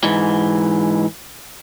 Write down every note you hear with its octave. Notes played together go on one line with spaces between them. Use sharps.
G#2 E3